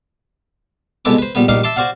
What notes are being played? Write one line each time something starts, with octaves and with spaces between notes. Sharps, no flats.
C2 B2 G#3 A4 B4 D6
B4 C5
A#1 G3 B3 B4
A#1 G3 D#4 F5 D6
E5 A5 C6 D6
F#4 C5 D5 F5 F#5